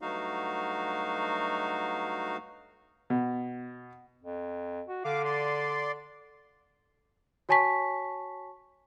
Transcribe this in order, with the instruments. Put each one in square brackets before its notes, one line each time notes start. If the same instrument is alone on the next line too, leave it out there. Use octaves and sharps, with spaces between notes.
[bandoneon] G2 F#3 A3 D#4 F#4 F5
[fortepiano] B2
[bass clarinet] F2
F#4
[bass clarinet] D3 [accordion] F5 D6
[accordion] D5 C6
[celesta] F#4 C#5 G#5 A5 C#6 B6